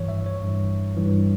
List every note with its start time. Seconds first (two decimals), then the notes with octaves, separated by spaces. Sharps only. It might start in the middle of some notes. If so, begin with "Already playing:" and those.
Already playing: G2 E3 C#5
0.08 E5
0.26 C#5
0.44 G2 E3
0.96 G2 E3